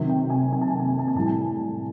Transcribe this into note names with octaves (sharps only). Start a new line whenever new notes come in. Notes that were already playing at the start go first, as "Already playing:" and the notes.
Already playing: C3 D#3 F#3
G5
G#5
G#5
A5
G#5
A5
G#5
A5
G#5
A2 E3 G3 A5
G#5